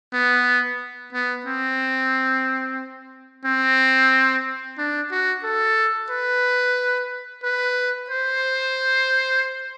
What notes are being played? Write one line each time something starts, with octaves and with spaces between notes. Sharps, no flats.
B3
B3
C4
C4
D4
F#4
A4
B4
B4
C5